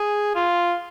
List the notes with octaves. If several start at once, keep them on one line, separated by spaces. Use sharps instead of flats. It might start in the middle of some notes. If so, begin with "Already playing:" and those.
Already playing: G#4
F4